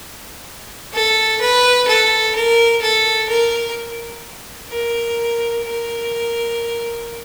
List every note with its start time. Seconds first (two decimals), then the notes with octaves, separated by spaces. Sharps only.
0.93 A4
1.41 B4
1.88 A4
2.35 A#4
2.82 A4
3.29 A#4
4.70 A#4
5.64 A#4